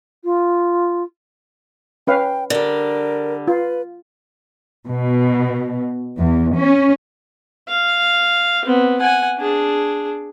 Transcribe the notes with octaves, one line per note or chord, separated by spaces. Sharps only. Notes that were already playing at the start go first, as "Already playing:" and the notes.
F4
C#4 B4 F5 G5
D3 G3 A#4
F4 B4
B2
E2
C#4
F5
B3 C4
F#5 G#5
D4 G#4